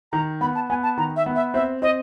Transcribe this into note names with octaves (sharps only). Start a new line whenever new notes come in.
D#3 A#5
B3 B5
A5
B3 G#5
A5
D#3 A#5
E5
B3
E5
C4 E5
C4 D#5